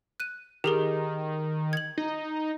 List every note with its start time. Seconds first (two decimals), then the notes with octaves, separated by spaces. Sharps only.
0.20 F#6 D#7
0.64 D#3 G4 G#4 A#4
1.73 G#6 F#7
1.98 D#4